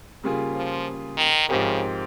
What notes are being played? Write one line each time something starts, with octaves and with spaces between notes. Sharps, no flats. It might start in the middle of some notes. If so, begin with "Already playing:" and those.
C#3 G3 A#3 F4 G#4
F3
D#3
G#2 C#3 F3 C4 G4 A#4